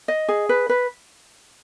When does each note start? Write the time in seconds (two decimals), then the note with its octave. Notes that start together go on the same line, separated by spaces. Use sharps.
0.08 D#5
0.28 G#4
0.49 B4
0.69 B4